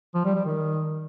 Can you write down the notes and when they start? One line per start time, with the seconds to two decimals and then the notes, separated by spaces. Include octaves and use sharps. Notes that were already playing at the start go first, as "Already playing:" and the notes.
0.15 F3
0.25 G3
0.35 G3
0.45 D#3